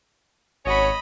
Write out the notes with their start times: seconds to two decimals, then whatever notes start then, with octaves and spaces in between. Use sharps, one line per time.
0.66 G#1 C#4 F#4 C#5 D#5 B5